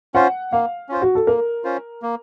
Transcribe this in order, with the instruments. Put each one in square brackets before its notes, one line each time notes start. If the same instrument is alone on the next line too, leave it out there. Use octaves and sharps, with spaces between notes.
[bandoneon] C#4 F4 C5 [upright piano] F#5
[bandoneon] A#3 [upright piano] F5
[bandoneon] C#4 F4 C5
[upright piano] F#4
A4
[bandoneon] A#3 [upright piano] A#4
[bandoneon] C#4 F4 C5
A#3